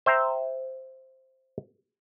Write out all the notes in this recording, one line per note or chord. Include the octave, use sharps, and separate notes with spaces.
C5 E5 G5 A#5